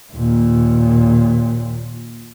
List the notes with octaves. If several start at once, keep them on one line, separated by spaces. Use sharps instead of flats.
D#2 A#2